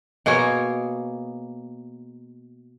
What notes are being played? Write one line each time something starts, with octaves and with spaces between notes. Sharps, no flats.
B2 A#3 G#4 C#5